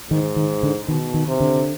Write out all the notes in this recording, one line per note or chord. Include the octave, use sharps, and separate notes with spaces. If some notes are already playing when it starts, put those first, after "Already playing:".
G#2 D#3
D#3
D3
B2 D#3
D#3
C3
D3